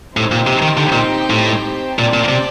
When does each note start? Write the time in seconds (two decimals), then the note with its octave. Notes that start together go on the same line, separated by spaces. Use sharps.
0.17 A2 C4 D#4 G4 C5 G5
0.32 A#2
0.47 C3
0.62 D#3
0.77 D3
0.92 A#2
1.30 A2
1.99 A#2 C4 G4 D5 A5
2.14 A#2
2.29 C3